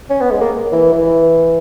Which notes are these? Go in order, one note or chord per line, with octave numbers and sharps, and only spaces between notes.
C#4
B3
G#3
A#3
E3
E3